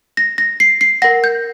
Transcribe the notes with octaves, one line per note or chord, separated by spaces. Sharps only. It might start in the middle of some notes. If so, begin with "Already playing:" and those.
A#6
A#6
C7
C7
A#4 F#5 A#6
G6